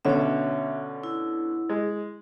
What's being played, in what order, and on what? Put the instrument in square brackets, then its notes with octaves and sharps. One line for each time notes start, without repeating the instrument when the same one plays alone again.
[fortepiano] B2 D3 C#4 [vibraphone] C#5 E5
[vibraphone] E4
[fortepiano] G#3